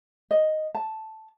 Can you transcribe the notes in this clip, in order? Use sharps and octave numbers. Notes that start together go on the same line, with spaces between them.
D#5
A5